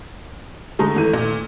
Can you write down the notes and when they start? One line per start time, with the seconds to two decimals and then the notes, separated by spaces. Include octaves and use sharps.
0.79 D3 G#3 A3 G#4 A#5
0.96 G#1 E3 A3 D#7
1.13 A#2